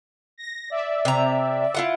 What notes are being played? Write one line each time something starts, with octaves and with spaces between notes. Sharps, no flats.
A#6
D5 E5
C3 A#5
E4 F4 F#5